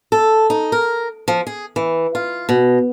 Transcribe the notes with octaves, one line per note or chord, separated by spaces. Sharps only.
A4
D#4
A#4
F3
G#4
E3
F4
B2